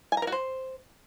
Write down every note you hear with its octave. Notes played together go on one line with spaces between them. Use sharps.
G#5
A#5
A#4
F#4
C5